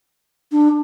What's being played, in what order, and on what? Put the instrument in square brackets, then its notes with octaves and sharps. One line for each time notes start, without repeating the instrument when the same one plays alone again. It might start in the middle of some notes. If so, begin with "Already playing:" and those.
[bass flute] D4